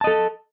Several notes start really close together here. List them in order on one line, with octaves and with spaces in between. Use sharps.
A5 D#5 A4